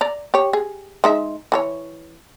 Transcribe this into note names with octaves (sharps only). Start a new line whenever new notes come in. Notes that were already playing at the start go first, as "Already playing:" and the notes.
D5 A#5
G4 C#5
G#4
G#3 D#4 E5
E3 A4 C#5